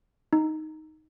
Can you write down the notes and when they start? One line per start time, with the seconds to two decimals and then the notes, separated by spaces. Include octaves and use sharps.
0.33 D#4